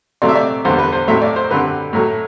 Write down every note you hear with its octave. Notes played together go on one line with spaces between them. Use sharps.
C3 F#3 A3 C4 D5
E5
D5
E2 D3 G3 B3 C5
B4
C5
A2 F#3 A3 C4 E5
D5
C5
F#2 D3 G3 C4 B4
A2 F#3 A3